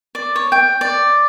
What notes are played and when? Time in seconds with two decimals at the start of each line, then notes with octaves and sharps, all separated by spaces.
0.15 D5
0.36 C#5
0.52 G5
0.81 D5